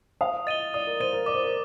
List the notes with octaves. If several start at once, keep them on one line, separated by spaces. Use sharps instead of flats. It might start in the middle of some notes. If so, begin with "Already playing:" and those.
F5 D#6
D#5 A6 D#7 G7
D5 D#6
A#4
C5 A6 D#7 G7
A#4
D5 D6
C5
A#4